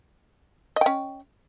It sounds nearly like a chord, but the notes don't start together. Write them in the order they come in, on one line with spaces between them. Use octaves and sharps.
D#5 G5 C#4